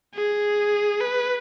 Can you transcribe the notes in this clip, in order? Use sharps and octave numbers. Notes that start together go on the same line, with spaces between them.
G#4
B4